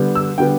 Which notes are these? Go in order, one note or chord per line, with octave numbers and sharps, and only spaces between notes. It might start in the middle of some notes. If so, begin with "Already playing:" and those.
Already playing: D3 G3 B3
E6
D3 G3 B3 G5